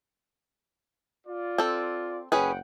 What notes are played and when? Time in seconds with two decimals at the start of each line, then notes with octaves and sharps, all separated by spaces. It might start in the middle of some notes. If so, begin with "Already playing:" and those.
1.27 F4 D5
1.58 C4 A4
2.32 F#1 C#4 G#4 B4 F#5 G5